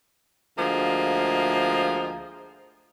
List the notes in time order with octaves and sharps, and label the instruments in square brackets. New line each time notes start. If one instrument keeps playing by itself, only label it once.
[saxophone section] D2 F3 G#3 A#3